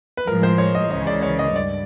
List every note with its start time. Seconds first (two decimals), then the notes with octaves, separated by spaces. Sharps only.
0.17 B4
0.27 A2 F3 G#3 A#4
0.43 C5
0.58 C#5
0.75 D#5
0.91 C#2 C#3 E3 D#5
1.07 D5
1.23 C#5
1.39 D#5
1.55 G2 D5